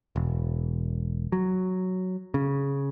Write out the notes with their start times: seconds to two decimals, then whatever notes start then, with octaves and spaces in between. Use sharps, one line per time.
0.16 E1
1.32 F#3
2.34 C#3